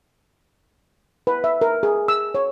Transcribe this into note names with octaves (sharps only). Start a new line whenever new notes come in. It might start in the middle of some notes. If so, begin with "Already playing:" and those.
B4
E5
A#4
G#4
E6
C#5